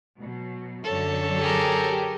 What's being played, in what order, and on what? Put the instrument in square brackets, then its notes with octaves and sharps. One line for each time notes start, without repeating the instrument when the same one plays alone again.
[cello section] B2 F#3
[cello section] F#2 D3 F#3 [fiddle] A4 C#5
[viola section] G4 [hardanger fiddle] G#4 A#4